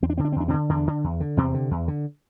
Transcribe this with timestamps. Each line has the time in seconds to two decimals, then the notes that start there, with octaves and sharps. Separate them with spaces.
0.02 E2 C4
0.10 D4
0.18 D3 C4
0.25 D4
0.32 C4
0.36 E2 D4
0.48 C3 C4
0.53 D3
0.69 E2 D3 D4
0.87 D3
1.04 E2
1.20 D3
1.37 E2 C3 C4
1.54 D3
1.71 E2
1.88 D3